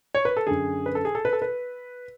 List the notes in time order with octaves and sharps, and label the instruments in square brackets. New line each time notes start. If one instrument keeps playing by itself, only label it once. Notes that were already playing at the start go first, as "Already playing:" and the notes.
[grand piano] C#5
B4
A4
F#2 D3 G#4
B4
A4
G#4
A4
B4
A4
B4